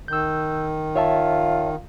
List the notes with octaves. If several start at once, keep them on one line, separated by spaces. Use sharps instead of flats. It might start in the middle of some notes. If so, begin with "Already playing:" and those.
D#3 E6 G6
F4 C#5 E5 A5